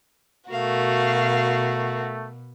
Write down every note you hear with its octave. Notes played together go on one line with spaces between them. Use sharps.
B2 A3 F#4 A#4 F5